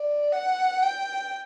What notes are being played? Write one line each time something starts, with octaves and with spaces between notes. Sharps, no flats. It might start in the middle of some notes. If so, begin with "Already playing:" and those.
Already playing: D5
F#5
G5